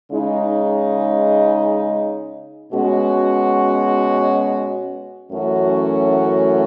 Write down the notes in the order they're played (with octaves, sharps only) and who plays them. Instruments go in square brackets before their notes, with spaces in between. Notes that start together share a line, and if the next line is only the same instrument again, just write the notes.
[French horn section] C#3 G#3 D#4
B2 G#3 C#4 F#4
F#2 E3 A3 C#4 F#4